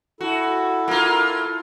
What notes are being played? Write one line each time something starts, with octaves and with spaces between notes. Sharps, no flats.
E4 F#4 A4
A#3 F4